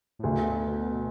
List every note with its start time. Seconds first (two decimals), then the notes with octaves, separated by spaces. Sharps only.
0.19 A2
0.23 D2 B2